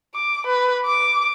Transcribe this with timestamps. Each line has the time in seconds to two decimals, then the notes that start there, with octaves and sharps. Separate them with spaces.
0.15 D6
0.47 B4
0.86 D6